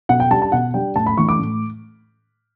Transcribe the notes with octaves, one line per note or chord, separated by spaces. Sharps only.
B2 F#5
G5
G3 D4 A5
A5
B2 F#5
G3 D4 G5
A2 A5
B5
E3 A3 D4 C#6
D6
A2